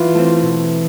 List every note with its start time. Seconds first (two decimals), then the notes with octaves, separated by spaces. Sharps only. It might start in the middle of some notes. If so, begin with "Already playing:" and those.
Already playing: E3 F4 F#4
0.15 A3 C4
0.42 B2